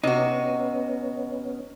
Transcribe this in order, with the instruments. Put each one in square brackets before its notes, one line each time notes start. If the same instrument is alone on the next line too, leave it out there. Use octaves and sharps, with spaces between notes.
[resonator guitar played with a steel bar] C3 F#4 [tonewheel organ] B3 C#4 [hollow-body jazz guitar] D#4 [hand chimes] D#5